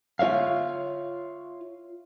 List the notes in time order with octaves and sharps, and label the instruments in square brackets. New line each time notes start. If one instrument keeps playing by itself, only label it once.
[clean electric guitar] F4 C#5 E5 F5